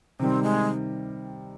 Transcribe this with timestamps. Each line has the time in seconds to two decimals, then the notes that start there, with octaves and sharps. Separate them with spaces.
0.20 C3 D#3 G3 C4
0.43 G#3